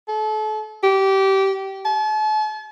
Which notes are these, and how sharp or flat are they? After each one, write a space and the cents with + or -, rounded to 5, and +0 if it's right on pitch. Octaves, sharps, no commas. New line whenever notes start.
A4 -35
G4 -20
A5 -40